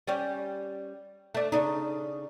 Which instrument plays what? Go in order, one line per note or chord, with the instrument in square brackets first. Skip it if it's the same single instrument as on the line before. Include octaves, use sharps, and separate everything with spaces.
[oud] G3 C#4 G4
A3 D4
C#3 D4 D#4